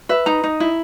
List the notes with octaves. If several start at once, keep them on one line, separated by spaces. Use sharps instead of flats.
B4 E5
D#4 A#5
D#4
E4